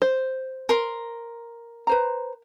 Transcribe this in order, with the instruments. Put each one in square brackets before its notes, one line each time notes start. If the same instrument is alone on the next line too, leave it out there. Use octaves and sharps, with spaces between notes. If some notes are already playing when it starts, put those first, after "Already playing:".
[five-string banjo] C5
[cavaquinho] A#4 C6
[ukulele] B4 C5 A#5